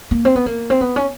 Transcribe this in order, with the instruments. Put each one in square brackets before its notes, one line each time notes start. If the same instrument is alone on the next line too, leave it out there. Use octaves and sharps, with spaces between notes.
[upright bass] A#3
C4
B3
A#3
C4
B3
C#4